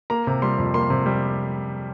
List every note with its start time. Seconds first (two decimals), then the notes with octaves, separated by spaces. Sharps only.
0.10 A#3 A#5
0.27 C3
0.42 G3 C6
0.58 F2
0.74 A#3 C6
0.90 C3
1.06 G3